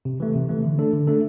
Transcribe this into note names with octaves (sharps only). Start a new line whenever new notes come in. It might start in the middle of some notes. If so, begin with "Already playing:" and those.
C3
E3 A3
C3
E3 A3
D3
A3 D4 A4
D3
A3 D4 A4